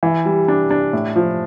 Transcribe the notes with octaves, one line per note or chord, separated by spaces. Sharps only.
E3
G3
D4
D4
A2
F3